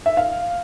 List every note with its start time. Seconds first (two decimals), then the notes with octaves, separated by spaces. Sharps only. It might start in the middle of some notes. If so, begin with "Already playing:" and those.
0.06 E5
0.17 F5